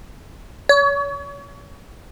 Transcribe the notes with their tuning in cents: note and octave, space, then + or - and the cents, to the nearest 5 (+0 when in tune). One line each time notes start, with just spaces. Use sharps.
C#5 +35